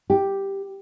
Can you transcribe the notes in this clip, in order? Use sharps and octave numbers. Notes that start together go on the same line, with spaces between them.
G4